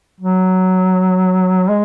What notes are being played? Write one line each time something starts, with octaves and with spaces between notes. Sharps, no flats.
F#3
G#3